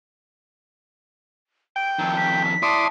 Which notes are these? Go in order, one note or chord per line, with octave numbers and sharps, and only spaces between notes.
G5 D7
F2 D#3 E6
B6
E4 D5 A5 C6 D#6